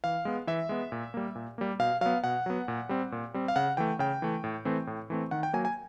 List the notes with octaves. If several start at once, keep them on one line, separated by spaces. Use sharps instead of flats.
E3 F5
G#3 B3
E3 E5
G#3 B3
A#2
G3 A#3
A#2
G3 A#3
B2 F5
F#3 B3 F5
B2 F#5
F#3 B3
A#2
G3 C4
A#2
G3 C4
F5
C#3 F#5
E3 A3 G5
C#3 G5
E3 A3
A2
E3 A3 C4
A2
E3 A3 C4
D#3 F#5
G5
F#3 A#3 G#5
G#5